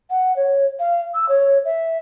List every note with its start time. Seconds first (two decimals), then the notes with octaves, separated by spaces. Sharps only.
0.10 F#5
0.36 C#5
0.80 F5
1.14 E6
1.29 C#5
1.65 E5